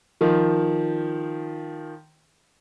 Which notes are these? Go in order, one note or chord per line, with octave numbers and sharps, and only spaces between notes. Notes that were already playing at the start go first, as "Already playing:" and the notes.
D#3 F3